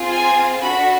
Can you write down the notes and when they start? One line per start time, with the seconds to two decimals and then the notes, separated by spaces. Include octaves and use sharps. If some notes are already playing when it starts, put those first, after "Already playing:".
Already playing: C4 F4 G#4
0.12 G#5
0.62 D4 F#4 A4 B5